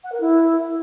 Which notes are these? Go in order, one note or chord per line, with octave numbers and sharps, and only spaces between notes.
F#5
A#4
E4